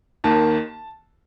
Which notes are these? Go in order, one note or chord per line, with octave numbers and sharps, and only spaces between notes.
D#2 D#3 A#3 A5